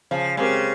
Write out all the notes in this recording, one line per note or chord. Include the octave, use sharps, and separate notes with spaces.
C#3 F3
C#3 G#3 C4 G4 A#4